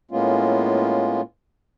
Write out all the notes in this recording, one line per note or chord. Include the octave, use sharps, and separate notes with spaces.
A2 G#3 A#3 B3 C#4 F4